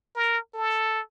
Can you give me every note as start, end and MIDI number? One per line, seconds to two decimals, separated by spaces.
0.16 0.39 70
0.54 1.00 69